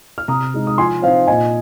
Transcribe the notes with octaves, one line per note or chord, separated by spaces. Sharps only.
F6
C3 A#5 D#6
G#3 D#4
D#6
F3 G#5 C6
C4 D#4 C5 F5
A#2 D#5 G#5